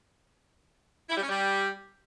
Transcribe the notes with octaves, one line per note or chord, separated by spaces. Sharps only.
E4
G3
C#4
G3